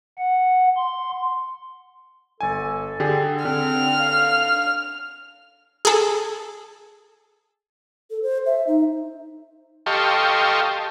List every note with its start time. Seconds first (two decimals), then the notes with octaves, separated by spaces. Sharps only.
0.18 F#5
0.76 C6
2.41 G1 A4 G#5
3.00 D3 G4 G#4
3.45 D3 C4 F6
3.99 F5
5.85 G#4 A4
8.11 A4
8.23 C5
8.46 E5
8.67 D#4
9.86 G4 A4 D#5 F5 C6 C#6